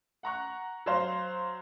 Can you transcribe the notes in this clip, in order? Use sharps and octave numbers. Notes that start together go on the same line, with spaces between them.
F#5 A#5 C#6 F#6
F#3 C5 F5